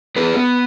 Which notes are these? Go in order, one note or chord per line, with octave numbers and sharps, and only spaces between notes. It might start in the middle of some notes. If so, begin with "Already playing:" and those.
B3 G#4 B4
B3